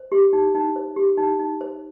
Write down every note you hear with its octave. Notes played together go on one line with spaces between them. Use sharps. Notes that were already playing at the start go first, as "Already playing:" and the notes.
Already playing: C5
G4
D#4
D#4
C5
G4
D#4
D#4
C5